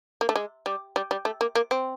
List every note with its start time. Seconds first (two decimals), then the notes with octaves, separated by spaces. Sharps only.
0.21 A#3
0.29 A3
0.36 G#3
0.66 G3
0.96 G3
1.11 G3
1.25 A3
1.41 A#3
1.55 A#3
1.71 C4